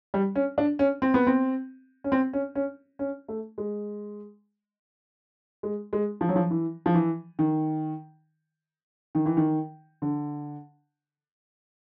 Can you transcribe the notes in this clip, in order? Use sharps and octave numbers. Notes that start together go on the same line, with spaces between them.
G3
C#4
D4
C#4
C4
B3
C4
C#4
C4
C#4
C#4
C#4
A3
G#3
G#3
G#3
F3
F#3
F3
E3
F3
E3
D#3
D#3
E3
D#3
D3